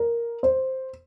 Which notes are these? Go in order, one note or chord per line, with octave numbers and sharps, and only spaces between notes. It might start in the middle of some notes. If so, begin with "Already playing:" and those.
Already playing: A#4
C5